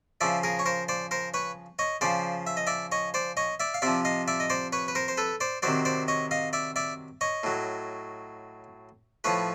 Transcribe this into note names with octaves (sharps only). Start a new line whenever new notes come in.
C#3 F3 D5 E5
G#4 A#4
C#5
A#4 C5
C5 D5
A#4 C5
B4 C#5
C#5 D#5
C#3 F3 C5 D5
E5
D#5
D5 E5
C#5 D#5
C5 D5
C#5 D#5
D5 E5
F5
C3 F3 D5 E5
D#5 F5
D5 E5
D#5
C5 D5
B4 C#5
B4
A#4 C5
C5
A4 B4
C5 D5
C3 D#3 F#3 C5 D5
C5 D5
C#5 D#5
D#5 F5
D5 E5
D5 E5
C#5 D#5
A2 F#3
A2 F3 B4 C#5